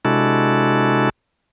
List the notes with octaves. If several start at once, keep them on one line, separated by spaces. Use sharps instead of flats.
C3 G#3 D4 E4 F#4 A4